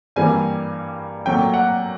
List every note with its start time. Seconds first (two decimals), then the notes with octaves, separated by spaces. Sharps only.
0.16 G2 E3 G3 A#3 G#5
1.26 A#2 F#3 A3 G5
1.54 F#5